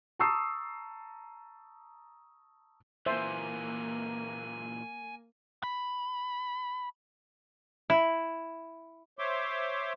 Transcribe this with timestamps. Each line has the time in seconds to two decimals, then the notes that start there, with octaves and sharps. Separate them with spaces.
0.19 A5 A#5 C#6 D#6 E6 C7
3.06 A#2 E3 A#3 C5 E5 G#5
5.63 B5
7.90 E4
9.19 C5 C#5 E5 C6 D6